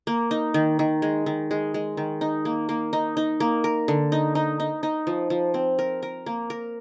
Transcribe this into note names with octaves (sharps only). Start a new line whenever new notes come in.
A#3
D#4
D#3
D#3
G#3
D#3
G#3
G#3
D#3
D#4
A#3
A#3
D#4
D#4
A#3
A#4
D3
D#4
D#4
D#4
D#4
F3
F3
C4
A#4
A#4
A#3
A#4